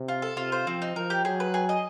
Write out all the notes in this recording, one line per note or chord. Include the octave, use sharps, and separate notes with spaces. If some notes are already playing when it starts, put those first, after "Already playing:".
Already playing: C3
F4
A4
C3 F4
C5
F3 C4
D#4
F3 A#4
G4
F#3 G#4
B4
G#4
D#5